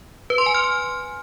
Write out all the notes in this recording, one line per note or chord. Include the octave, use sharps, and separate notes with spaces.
B4
C6
G#5
F6